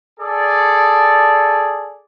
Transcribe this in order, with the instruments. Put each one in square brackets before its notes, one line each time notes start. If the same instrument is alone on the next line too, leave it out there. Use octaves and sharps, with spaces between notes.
[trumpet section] G#4 A4 D5